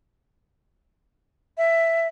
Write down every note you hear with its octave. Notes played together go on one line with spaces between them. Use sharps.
E5